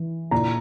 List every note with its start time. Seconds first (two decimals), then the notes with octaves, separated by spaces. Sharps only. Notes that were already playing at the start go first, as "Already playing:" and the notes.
Already playing: E3
0.31 A#2 A#5